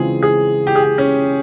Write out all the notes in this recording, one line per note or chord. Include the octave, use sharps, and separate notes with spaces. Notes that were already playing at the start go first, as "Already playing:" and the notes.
Already playing: C#3 E3 G#3 C4 F4 G#4
G#4
G4
G#4
G4
C#4